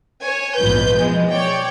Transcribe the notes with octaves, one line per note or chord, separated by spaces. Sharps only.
C#5 G#5
A#1 E2 G#2 F4 B4 G6
B2 E3 F3 G#3 B3
C#5 D5 G5